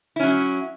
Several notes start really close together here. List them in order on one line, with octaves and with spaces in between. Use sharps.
E4 C#4 F#3